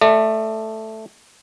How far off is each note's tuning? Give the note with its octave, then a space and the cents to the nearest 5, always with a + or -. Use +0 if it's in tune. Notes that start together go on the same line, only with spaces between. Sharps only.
A3 +0 D5 +35